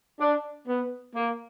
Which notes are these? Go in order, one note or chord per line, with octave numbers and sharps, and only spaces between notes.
D4
B3
A#3